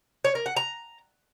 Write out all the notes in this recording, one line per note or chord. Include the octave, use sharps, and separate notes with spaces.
C#5
A#4
F#5
A#5